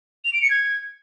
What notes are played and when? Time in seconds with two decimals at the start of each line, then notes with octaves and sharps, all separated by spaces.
0.25 F7
0.33 D7
0.42 C#7
0.50 G#6